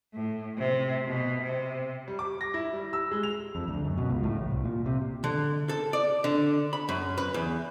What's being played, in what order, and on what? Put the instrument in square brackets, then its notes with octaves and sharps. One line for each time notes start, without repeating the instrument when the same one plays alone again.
[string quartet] A2
C3
B2
C3
[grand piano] G3
D6
A#6
E4
G3
E6
G#3
F7
[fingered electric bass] F2
D2
F#2
B2
C#2
A2
A1
C2
A#2
C3
[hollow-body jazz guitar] D3
A4
D5
D3
B5
F#2
B4
E2